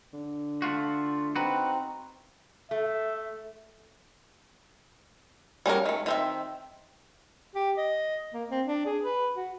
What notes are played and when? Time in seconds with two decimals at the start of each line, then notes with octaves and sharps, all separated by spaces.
0.13 D3
0.62 A3 F4 F#4
1.36 C4 D#4 F#4 B4
2.71 A3 E5
5.66 G3 C#4 F#4 A#4
5.86 D#3 A3
6.06 D#3 C4 E5
7.56 G4
7.78 D#5
8.34 A#3
8.51 C4
8.65 D4
8.86 G#4
9.04 B4
9.36 F#4